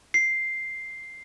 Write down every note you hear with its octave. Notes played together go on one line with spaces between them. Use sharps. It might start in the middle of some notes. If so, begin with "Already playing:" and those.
C7